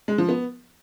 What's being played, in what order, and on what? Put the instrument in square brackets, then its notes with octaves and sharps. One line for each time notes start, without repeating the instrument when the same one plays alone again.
[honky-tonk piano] G#3
F3
B3